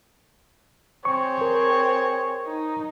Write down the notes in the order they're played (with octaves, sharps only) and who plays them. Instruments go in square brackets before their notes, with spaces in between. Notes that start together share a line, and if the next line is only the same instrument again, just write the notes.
[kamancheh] C4 [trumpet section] G#4 C#5 [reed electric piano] C#6
[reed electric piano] A#4
[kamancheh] D#4